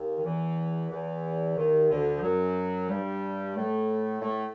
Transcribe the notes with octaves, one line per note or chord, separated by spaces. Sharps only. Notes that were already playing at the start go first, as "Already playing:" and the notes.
Already playing: D#2
D#3
E2 E3
E2 E3
D#2 D#3
D2 D3
F3
F#2 F#3
G2 G3
A2 A3
A2 A3